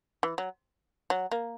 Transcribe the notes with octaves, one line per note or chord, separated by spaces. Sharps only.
E3
F#3
F#3
A#3